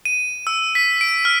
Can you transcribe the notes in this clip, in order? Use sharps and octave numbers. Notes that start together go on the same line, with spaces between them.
D#7
E6
B6
D7
F6